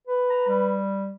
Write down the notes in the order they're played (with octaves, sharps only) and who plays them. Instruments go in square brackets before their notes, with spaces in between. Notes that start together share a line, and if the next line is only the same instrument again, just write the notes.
[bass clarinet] B4
[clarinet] A#5
G3